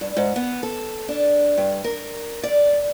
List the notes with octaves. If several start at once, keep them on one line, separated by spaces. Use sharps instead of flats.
G2
G#2
B3
A4
D4
G2
A#4
D5